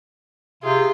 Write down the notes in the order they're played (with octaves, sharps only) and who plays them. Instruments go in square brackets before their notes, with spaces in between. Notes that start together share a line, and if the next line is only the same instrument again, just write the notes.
[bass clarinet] C3 [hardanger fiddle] F4 [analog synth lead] G#4